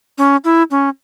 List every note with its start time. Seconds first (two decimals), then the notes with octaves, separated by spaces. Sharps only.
0.18 C#4
0.44 E4
0.71 C#4